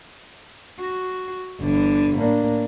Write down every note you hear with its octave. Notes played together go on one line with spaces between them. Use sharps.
F#4
G1 D3 E3
A2 A#3 D4